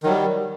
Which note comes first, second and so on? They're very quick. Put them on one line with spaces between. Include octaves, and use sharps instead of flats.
D#3 F#3 G3